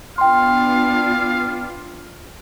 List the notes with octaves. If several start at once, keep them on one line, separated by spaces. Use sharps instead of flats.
B3 D4 F4 F5 G5 C6